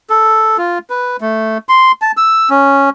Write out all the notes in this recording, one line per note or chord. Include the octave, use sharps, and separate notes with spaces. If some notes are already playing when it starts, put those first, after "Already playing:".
A4
F4
B4
A3
C6
A5
E6
C#4